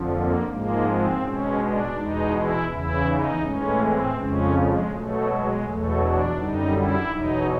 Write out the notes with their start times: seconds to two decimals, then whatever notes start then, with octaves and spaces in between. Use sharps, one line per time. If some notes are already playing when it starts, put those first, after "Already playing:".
Already playing: F2 D3 F3
0.10 A#3
0.47 G#2 F3 G#3 A#3
0.85 C4
1.21 B2 G#3 C#4
1.58 D4
1.95 E2 B2 G#3 D#4
2.32 E4
2.68 E2 C#3 E3 E4
3.05 D#4
3.41 A2 E3 G#3 C#4
3.78 C4
4.15 F2 C#3 F3 G#3 C#4
4.52 G#3
4.89 B2 F#3 A3
5.25 G#3
5.62 E2 B2 F#3 A3
5.99 D4
6.35 F#2 D3 G3 D#4
6.72 E4
7.09 E2 B2 F#3 D#4